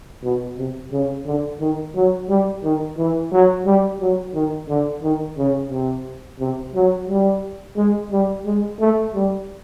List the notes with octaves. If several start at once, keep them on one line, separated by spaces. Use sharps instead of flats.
B2
C3
C#3
D3
D#3
F#3
G3
D#3
E3
F#3
G3
F#3
D#3
D3
D#3
C#3
C3
C3
F#3
G3
G#3
G3
G#3
A3
G3